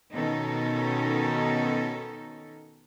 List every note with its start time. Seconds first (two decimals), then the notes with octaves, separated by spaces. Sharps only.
0.13 B2 D#3 C#4 D#4 A4